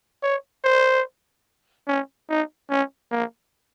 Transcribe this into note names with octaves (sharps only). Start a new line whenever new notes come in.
C#5
C5
C#4
D#4
C#4
A#3